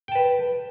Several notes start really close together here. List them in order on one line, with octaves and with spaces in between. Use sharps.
G5 A5 B4